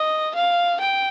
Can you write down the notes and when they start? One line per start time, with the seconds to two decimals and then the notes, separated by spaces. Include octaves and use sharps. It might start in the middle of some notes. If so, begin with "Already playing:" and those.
Already playing: D#5
0.35 F5
0.81 G5